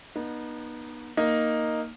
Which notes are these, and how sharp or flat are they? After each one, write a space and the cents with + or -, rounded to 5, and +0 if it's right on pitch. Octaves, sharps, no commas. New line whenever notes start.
B3 -35 D#4 -25
A#3 +0 D#4 +0